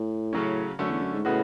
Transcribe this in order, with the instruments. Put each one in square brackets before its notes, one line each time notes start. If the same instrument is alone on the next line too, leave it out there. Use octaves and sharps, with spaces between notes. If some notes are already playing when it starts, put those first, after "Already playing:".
Already playing: [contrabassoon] A2
[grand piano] C#3 F#3 C#4
[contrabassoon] F#2 [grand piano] D3 A3 C#4
[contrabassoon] E2
F#2
G#2
[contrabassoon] A2 [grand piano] C#3 G#3 B3 F#4